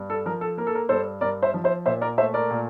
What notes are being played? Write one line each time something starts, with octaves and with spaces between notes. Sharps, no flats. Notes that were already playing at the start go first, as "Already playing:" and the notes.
Already playing: G2
A4
F3 A#4
A4
A#3 A#4
A4
A#4
G2 A4 C5
G2 A#4 D5
C5 E5
F3
C5 E5
A#2 C5 E5
A#4 D5
A3 C5 E5
A#4 D5
A#2